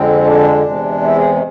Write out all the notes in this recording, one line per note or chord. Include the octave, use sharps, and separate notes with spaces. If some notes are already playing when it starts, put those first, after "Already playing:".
Already playing: F2 D3 G#3 C4
D4
E2 C3 G#3
E4
G#4